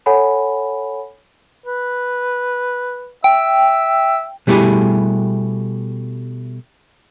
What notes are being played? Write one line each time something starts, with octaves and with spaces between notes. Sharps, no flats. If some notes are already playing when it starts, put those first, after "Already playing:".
A4 C#5 F#5 G#5 B5
B4
E5 G5
B2 G3 A3 E4 G4 G#4